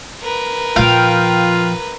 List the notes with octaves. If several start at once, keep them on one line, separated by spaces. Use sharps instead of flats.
A#4 B4
A#2 F3 F4 F5 G5